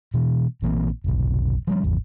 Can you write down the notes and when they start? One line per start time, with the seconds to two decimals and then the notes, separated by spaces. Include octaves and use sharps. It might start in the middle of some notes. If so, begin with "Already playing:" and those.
0.14 B2 E3
0.62 A#1 E3 A#3 C4
1.04 F1 B1
1.67 F3 G3 C#4
1.83 G#1 E2